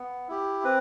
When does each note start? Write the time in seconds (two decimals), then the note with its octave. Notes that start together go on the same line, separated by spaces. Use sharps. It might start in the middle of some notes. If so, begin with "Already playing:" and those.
Already playing: B3
0.28 E4 G4
0.64 C4 B4